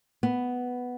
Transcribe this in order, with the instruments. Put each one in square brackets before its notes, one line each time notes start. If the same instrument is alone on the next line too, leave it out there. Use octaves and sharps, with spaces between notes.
[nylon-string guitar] B3